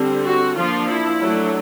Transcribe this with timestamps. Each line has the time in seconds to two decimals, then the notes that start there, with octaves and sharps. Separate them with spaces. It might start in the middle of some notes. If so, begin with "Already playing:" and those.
Already playing: D3 G3 C4
0.24 F#4
0.57 F3 A#3 D4 F4
0.89 E4
1.22 F#3 A3 D4